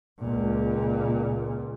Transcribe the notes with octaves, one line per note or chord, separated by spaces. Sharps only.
C#2 A#2